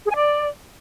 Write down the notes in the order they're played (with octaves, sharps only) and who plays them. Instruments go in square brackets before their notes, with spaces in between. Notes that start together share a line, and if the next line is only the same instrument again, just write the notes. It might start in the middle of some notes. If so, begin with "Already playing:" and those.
[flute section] G#4
G#5
D5